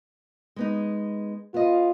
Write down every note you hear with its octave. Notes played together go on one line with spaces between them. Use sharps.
G#3 B3 D#4
B3 F4 D#5